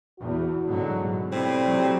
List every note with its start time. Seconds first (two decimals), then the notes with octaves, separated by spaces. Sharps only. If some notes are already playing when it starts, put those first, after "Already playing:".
0.19 E2 F#4
0.68 G#2 D3 F#3
1.00 B2
1.32 A2 C3 G3 C4
1.63 F#3